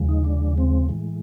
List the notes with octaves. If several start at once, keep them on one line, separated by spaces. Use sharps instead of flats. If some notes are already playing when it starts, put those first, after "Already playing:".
Already playing: D#2 C#3 F3 G#3
D#4
D4
C4
A2 E3 G#3